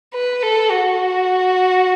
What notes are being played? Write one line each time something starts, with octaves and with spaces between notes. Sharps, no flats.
B4
A4
F#4